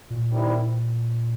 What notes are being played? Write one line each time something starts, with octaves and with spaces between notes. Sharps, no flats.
A#2
D#3 G3 C4 E4